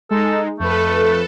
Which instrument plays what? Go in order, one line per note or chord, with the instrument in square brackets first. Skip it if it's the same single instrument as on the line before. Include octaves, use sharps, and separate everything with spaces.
[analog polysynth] G#3 D#4 [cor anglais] A4
[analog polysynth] F2 B4 [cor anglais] A3 [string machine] A4